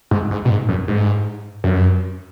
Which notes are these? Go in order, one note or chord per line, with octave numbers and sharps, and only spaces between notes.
G#2
G#2
B2
G#2
F#2
G#2
F#2